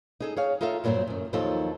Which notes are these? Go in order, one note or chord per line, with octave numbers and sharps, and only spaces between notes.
D#4 G#4 A4
G#4 C#5 F5
D#4 F4 A4 E5 F5
G2 A#2 F#3 F4 A#4 C5
F#2 D#3
D#2 F3 F#3 D#4 F4 A4